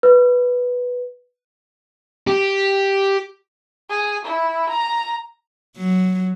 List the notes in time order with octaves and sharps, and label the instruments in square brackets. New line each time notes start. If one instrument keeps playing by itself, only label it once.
[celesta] B4
[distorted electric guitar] G4
[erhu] G#4
E4
A#5
[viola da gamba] F#3